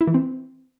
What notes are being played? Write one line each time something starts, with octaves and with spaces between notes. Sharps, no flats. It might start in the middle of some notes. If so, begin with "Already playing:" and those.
E4
E3
C4